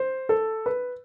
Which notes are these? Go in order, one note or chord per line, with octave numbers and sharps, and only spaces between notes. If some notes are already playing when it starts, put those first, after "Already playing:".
Already playing: C5
A4
B4